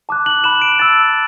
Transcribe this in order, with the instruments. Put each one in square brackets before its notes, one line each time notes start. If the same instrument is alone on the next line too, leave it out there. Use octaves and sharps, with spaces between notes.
[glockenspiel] A5 D6 F#6
F#7
B5 F#6 E7
D7
A5 E6 A6